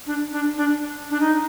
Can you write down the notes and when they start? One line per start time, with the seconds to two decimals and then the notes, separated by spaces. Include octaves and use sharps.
0.06 D4
0.32 D4
0.57 D4
1.10 D4
1.20 D#4